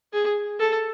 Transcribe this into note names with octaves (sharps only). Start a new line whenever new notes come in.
G#4
A4